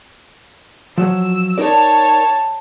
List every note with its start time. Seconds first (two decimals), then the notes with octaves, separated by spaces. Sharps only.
0.98 F3 F#3 E6
1.58 D#4 A#4 C#5 D5 A5